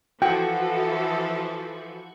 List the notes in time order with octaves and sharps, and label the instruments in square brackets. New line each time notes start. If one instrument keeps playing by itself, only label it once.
[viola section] E3 F3 A4 [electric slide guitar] F#4 [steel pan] G5